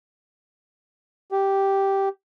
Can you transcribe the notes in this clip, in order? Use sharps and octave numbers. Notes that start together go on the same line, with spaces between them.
G4